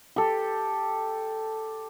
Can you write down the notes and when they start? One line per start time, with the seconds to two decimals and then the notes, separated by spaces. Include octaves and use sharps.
0.16 G4 A4